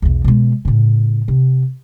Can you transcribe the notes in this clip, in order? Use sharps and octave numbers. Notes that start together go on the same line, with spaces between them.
B1 E2
B2 G#3
A2 C#3
C3